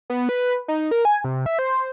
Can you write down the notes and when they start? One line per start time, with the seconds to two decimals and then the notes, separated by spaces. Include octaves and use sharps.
0.10 B3
0.29 B4
0.68 D#4
0.91 A#4
1.05 G#5
1.24 C3
1.46 E5
1.59 C5